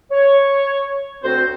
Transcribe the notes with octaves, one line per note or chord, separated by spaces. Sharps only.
C#5
D2 C4 F#4 C5